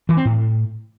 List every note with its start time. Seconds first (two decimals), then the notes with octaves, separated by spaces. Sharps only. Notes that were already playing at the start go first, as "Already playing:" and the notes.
0.09 E3
0.17 C4
0.25 A2